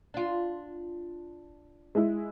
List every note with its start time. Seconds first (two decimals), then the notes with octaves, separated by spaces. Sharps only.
0.14 D4 F4
1.95 G#3 E4